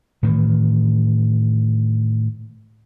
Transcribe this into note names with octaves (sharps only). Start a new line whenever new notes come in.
A2 D#3 E3